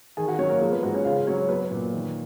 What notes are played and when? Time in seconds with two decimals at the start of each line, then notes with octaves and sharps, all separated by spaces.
0.17 D#3 G#4 G#5
0.28 F#4 F#5
0.38 F#3 C#4 C#5
0.50 A#3 A#4
0.61 F3 G#3 G#4
0.72 B3 B4
0.83 G#2 F#4
0.94 C#4 C#5
1.05 C#3 F4 F5
1.27 F#3 C#4 C#5
1.49 F#3 B3 B4
1.71 A#2
1.93 D#3